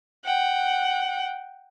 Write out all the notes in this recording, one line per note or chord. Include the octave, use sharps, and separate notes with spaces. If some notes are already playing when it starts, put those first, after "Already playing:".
F#5 G5